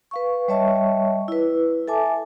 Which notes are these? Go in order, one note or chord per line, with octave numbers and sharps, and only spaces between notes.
B4 F5 C#6
G3 C#5 D#5 E5 A5 C#6
E4 B4
A4 E5 G#5 A5 D6